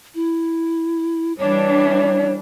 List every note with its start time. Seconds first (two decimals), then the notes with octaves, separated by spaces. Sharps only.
0.15 E4
1.38 E3 G3 D4 C#5